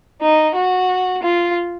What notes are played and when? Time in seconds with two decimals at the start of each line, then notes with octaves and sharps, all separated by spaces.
0.22 D#4
0.56 F#4
1.23 F4